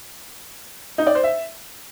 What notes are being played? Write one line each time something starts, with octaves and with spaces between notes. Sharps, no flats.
D#4
D5
C5
E5